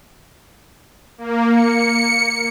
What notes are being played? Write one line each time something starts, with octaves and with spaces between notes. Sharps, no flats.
A#3
C#7